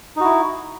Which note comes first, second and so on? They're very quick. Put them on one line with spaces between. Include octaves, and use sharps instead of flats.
D#4 F#4 E4